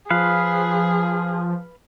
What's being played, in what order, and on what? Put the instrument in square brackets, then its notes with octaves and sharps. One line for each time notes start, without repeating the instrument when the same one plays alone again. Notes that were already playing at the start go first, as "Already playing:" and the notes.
[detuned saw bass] F3 [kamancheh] G#4 [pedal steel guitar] B4 F5